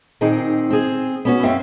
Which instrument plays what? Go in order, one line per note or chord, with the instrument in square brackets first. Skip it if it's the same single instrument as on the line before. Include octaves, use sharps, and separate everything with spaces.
[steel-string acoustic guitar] A#2 D#3 C4 D#4 G#4
C4 G#4
B3 C#4 F#4
F#2 C4 E5 F5